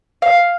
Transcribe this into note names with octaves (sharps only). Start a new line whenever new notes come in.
F5